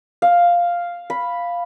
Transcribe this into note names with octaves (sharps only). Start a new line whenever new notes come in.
F5
B5